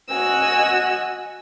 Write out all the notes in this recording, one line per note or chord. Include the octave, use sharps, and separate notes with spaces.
F#4 D#5 F#5 G#5 E6